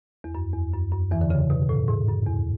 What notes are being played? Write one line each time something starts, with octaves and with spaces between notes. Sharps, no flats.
E2
F#2
E2
F#2
F#2
E2 E3
D3
C#3
B2
A2
G#2
F#2
E2